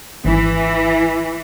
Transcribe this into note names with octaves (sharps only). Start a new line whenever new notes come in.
G#1 E3